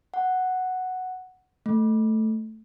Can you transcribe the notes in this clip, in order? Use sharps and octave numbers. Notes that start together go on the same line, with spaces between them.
F#5
A3